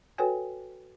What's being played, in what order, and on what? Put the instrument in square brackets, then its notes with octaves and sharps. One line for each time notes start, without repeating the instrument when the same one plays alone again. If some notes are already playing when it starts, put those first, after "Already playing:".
[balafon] F#4 A4 B4 C#5 G5 G#5